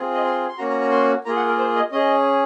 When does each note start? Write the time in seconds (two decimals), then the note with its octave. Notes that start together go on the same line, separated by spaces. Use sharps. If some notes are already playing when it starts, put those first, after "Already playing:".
Already playing: C4 F4 G#4
0.14 D#5
0.25 C6
0.48 C6
0.58 A#3 C#4 F#4 A#5
0.70 A#5
0.81 A#5
0.91 C6
1.25 A#3 F4 G#4 A#5
1.36 F#5
1.47 A#4
1.58 C5
1.76 D#5
1.92 C#4 G#4 D#5